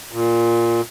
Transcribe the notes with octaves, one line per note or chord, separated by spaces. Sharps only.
A#2